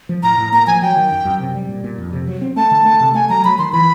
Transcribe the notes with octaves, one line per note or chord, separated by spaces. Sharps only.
F3
A2 A#5
A2
A#3 A#5
F3 G#5
F#3 G5
D#3
F#2
F#2
C3
G3
A#2
A#2
F2
C3
F#3
C4
A3 A5
D3
A3
C3
A3 G#5
F#3 A#5
F#3 B5
D#3 C6
E3 B5